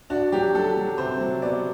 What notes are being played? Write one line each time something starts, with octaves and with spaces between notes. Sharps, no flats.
D4 F#4
F#3 G4
F#3 A4
F#3
C3 C5
F#3
B3 D5